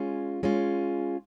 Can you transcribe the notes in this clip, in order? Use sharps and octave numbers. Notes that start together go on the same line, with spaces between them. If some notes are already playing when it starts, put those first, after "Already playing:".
Already playing: G#3 C#4 F4
G#3 C#4 F4